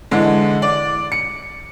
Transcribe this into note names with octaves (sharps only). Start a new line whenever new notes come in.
D3 E3 G#3
D5
C#7